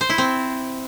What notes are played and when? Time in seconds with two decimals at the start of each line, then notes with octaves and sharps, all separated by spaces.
0.01 C5
0.10 E4
0.18 C4